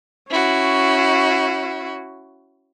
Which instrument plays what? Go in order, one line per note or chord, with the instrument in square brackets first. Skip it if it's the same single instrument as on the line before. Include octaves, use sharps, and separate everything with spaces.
[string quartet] C#4 E4 F#4